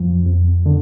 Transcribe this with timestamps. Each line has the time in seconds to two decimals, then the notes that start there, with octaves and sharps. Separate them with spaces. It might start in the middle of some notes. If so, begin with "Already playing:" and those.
Already playing: F2 F3
0.26 F2
0.66 D3